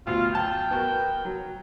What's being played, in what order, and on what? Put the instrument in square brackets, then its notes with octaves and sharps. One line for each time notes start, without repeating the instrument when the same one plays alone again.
[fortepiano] D2 B2 [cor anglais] F4
[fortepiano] F#2 A5 [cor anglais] G5
[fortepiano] B3 F#4 A#4
F#3